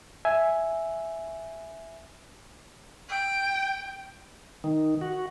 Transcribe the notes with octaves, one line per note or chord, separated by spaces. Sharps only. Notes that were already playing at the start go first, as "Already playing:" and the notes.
E5 G#5
G5
D#3
F#4